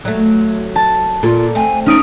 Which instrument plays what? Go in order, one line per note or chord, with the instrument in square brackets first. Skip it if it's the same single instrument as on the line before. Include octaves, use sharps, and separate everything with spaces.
[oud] F#3 A3
[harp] A5
[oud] A#2 [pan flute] F4 [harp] A4
[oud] A3 C4 [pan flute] G#5
[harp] C#4 D#6 D7 [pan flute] D#4